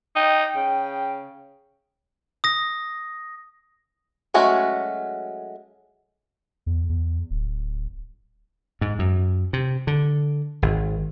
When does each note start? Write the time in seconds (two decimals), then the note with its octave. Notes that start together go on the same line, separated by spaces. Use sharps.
0.16 D#4 G5
0.56 C#3
2.44 D#6 A#6
4.34 F#3 G#3 A3 C#4 F#4
6.66 E2
6.89 E2
7.30 D1
8.81 G#2
8.99 F#2
9.53 C3
9.87 D3
10.62 G#1